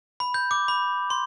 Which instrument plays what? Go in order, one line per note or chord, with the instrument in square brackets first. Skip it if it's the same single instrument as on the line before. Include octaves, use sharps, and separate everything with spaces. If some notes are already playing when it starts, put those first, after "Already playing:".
[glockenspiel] B5
G6
D6
B5
C6